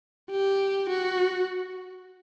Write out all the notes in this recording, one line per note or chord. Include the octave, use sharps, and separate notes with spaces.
G4
F#4